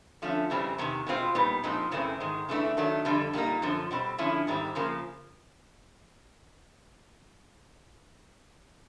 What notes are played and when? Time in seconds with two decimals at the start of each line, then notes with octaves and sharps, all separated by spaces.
0.22 D3 F3 A3 C#4
0.50 F2 C#3 E3 G3 C4
0.78 E2 C3 D#3
1.07 B2 G#3 C4 F4
1.35 A#2 G3 B3 D#4
1.63 A#2 F3 G#3 C4 D#4
1.92 F#2 C#3 E3 A3 C4
2.20 G#2 D#3 G#3
2.49 C#3 E3 A3 D4
2.77 D#3 F#3 A3 D4
3.05 F2 D3 G3
3.34 A#2 G3 A#3 D#4
3.62 F#2 D3 F3
3.91 B2 G3 C4
4.18 D3 F3 G#3 C#4 E4
4.47 G#2 D#3 G3 C4
4.75 E2 C#3 F3 A#3